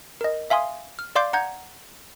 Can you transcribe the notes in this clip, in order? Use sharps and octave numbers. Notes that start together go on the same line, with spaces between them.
A#4 D#5
E5 F5 G#5 C6 D#6
F6
D5 F5 C6 D6 G6 C7
F#5 A#5 G6 G#6